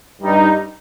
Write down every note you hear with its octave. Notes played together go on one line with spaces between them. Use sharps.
G2 G3 D#4 G4